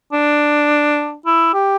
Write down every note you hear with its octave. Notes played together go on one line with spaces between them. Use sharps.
D4
E4
G4